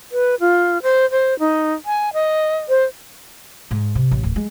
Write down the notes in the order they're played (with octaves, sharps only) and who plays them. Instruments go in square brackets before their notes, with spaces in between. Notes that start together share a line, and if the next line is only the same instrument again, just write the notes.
[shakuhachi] B4
F4
C5
C5
D#4
G#5
D#5
C5
[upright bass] G#2
C3
A1
D1
G#3